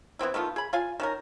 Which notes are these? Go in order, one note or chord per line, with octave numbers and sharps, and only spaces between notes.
E3 B3 C4 E4
D#3 A3 B3 F4
G#4 B5
F4 F5 G#5
D#3 C#4 A#4